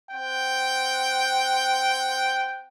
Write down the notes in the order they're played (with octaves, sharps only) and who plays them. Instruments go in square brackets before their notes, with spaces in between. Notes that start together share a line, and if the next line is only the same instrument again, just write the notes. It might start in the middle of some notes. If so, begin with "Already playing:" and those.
[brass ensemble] C4 F#5 G5